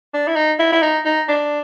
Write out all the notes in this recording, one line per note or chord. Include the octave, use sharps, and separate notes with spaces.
D4
E4
D#4
E4
E4
D#4
D#4
D4